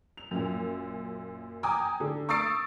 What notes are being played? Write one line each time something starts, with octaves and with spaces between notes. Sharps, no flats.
F7
F#2 A#2
G5 G#5 A#5 D6 D#6
D3
C#6 D#6 E6 A6 C7 D7